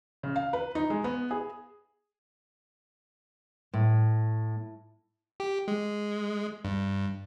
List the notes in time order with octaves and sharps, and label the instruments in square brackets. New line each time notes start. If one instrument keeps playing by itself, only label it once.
[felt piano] C#3
F5
B4
D#4
G#3
B3
G#4
[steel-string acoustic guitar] A2
[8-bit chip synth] G4
G#3
G2